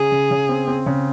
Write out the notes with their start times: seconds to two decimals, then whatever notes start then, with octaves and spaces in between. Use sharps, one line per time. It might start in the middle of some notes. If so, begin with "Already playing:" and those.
Already playing: C#3 G#4
0.12 C#3
0.31 C#3
0.49 C4
0.68 C4
0.86 C#3